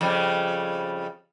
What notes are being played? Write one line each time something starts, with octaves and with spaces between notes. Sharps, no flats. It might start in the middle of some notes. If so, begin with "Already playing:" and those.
F2 C#3 G3